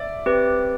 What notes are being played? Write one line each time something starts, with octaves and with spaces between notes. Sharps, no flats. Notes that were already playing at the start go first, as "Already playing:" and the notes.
Already playing: D5 E5
C4 G4 B4